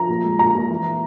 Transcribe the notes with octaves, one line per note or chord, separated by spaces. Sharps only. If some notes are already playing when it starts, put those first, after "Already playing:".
Already playing: F3 A#5
A#2
G#3
A#2 A#5
A#2
E3